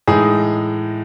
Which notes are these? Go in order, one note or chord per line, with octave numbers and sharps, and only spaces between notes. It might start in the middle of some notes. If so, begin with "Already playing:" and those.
A2 E3 G#3 D#4 G#4